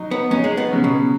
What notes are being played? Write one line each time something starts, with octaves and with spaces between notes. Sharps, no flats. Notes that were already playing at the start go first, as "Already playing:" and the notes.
Already playing: F#3 D#4
B3
F#3 C#4 D#4
G#3
B3
C#3 F#3 C#4
B2